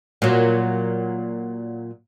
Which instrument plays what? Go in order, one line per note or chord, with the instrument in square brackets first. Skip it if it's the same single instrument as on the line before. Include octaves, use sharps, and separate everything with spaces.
[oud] A#2 F#3